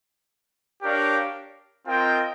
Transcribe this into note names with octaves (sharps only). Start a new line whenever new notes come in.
D4 G4 A#4 C#5 F5
C4 F4 A#4 D#5 G5